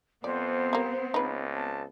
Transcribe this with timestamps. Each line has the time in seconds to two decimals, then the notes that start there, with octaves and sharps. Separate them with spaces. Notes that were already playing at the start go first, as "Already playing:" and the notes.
0.24 F2 B3 C4 C5 D5
0.73 G3 A#3
1.14 C#2 D#4 B4
1.54 A5